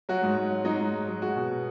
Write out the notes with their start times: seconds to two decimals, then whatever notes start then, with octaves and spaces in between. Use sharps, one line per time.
0.09 F#3 F#4
0.22 G#2
0.37 G#2
0.51 F#3
0.65 F#3 D#4
0.80 G#2
0.93 G#2
1.08 F#3
1.22 G#3 F#4
1.36 B2
1.50 B2